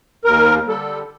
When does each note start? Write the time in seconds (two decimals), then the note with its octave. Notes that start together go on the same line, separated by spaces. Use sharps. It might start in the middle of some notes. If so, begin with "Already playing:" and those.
0.25 D#2 A#4
0.68 D3 G3 A4